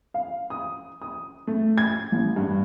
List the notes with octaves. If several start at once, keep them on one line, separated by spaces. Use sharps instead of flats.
F5
D#6
D#6
A3
G#6
A1
G2